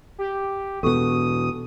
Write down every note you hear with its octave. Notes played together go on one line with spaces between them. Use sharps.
G4
E2 B2 A4 C#6 D#6